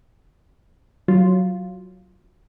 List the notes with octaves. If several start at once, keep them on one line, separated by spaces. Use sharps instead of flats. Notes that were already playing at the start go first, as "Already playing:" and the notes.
F#3 F4